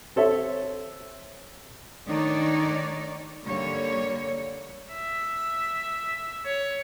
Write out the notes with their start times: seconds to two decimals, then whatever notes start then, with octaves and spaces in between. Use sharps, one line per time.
0.16 C4 A4 C#5 E5
2.08 D#3 A3 D4 D#4 C#5 D5
3.44 D3 G3 A#3 C#5
4.93 E5
6.45 C#5